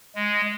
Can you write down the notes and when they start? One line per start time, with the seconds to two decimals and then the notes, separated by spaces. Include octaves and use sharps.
0.15 G#3